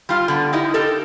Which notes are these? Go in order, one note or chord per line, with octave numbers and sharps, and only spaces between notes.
G3 F4
D3 B3
D#4 E4 G4 D#5
D#4 G4 A4 A#4